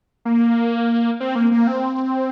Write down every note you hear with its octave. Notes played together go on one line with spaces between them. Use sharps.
A#3
C4
A#3
A#3
C4